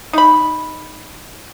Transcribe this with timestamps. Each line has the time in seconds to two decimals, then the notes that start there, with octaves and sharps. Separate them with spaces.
0.13 D#4 B5